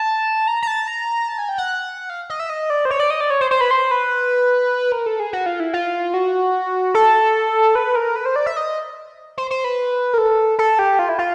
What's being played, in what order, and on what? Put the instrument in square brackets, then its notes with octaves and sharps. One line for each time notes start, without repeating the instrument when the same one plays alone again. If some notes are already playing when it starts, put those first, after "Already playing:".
Already playing: [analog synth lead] A5
A#5
A#5
A5
A#5
A5
G#5
G5
F#5
F5
D#5
E5
D#5
D5
C5
C#5
D5
D#5
D5
C#5
C5
C5
B4
C5
B4
A#4
A4
G#4
F#4
F4
E4
F4
F#4
A4
B4
A#4
B4
C5
D5
E5
D#5
C5
C5
B4
A#4
A4
A4
G4
F4
E4
F4